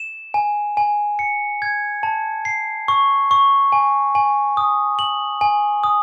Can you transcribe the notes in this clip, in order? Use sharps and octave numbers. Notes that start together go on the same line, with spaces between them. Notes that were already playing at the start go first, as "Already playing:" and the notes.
Already playing: E7
G#5
G#5
C#7
G#6
A5
C7
C#6
C#6
G#5
G#5
D#6
F#7
G#5
D#6